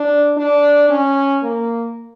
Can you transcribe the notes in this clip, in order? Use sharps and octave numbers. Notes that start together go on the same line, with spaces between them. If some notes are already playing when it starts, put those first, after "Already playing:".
Already playing: D4
D4
C#4
A#3